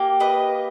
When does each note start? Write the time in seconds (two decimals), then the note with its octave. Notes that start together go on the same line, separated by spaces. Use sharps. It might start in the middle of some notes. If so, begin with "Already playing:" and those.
Already playing: A#3 G4
0.20 B4 D#5